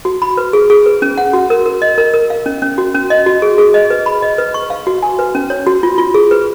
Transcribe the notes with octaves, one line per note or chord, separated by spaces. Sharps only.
F#4
B5
B4
G#4
G#4
B4
C#4
F#5
F#4
A#4
A#4
D#5
A#4
A#4
F5
C#4
C#4
F#4
C#4
D#5
F#4
G#4
G#4
D#5
B4
B5
D#5
B4
C#6
F5
F#4
G#5
B4
C#4
C#5
F#4
F4
F4
G#4
B4